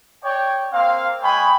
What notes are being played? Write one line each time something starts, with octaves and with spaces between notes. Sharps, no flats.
C#5 D5 G5
A#3 C4 F5
G#3 C#5 G5 G#5 B5